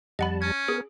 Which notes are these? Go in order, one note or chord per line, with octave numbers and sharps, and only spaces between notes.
F2 G3 D#5 F#5 A5 B5
C#4 G#6
B3 G#4 A#4